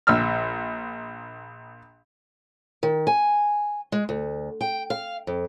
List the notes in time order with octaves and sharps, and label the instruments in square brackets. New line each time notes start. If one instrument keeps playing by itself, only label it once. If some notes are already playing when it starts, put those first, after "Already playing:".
[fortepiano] A#1 E6 F6
[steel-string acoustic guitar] D#3
G#5
G#3
D2
G5
F5
F2